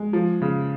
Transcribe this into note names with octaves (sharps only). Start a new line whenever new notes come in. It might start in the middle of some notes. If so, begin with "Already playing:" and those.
Already playing: G#3
F3
C#3